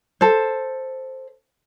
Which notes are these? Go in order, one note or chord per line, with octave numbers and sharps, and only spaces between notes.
A4 C5